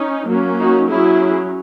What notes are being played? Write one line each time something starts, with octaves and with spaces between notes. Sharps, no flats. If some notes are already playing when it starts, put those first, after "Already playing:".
Already playing: C#4 D#4
F#3 A#3 C#4
D#4 F#4
F#3 C#4 E4 G#4